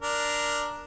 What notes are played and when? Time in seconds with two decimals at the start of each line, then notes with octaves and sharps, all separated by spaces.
0.02 D4 A#4